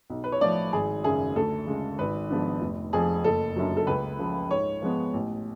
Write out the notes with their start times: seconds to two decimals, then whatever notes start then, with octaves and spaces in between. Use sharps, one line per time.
0.10 B1
0.24 B4
0.32 C#5
0.41 A2 F3 D5
0.73 G#1 G#4
1.04 F#2 C#3 G#4
1.36 D2 A4
1.67 C#3 G#3
1.99 G#1 B4
2.30 G#2 F3 B3 D4
2.61 F1
2.93 F2 F3 G#4
3.24 F#1 A4
3.56 F#2 D3 F#3
3.77 A4
3.87 C#2 B4
4.19 C#3 F3
4.50 G#2 C#5
4.82 F3 G#3 B3
5.14 A1